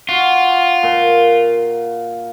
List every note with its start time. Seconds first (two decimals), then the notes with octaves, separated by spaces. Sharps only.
0.09 F4 F#4
0.83 A#2